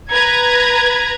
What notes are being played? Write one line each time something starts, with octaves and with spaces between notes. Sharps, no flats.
B4 A#5 G#6